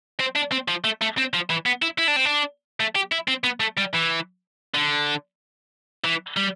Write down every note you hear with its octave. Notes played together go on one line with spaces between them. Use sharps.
C4
D4
C4
F3
A3
A3
C4
F3
E3
B3
E4
E4
D4
C4
D4
A3
G4
E4
C4
B3
A3
G3
E3
D3
E3
G3